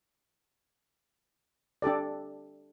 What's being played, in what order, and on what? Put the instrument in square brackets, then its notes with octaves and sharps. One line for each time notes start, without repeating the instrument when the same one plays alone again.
[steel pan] D4 G4 A4 D5